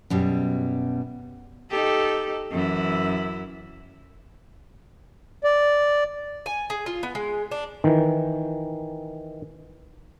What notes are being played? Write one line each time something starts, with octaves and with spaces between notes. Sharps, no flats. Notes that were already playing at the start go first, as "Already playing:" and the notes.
F#2 B2 G3
D#4 G4 A4
F#2 E3 E4
D5
G#5
G#4
F4
B3
G#3
D4
D#3 E3